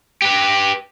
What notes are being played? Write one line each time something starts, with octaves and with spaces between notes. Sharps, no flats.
G4 B4